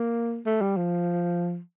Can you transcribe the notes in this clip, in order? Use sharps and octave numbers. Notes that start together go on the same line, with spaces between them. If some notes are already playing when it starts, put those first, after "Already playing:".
Already playing: A#3
A3
G3
F3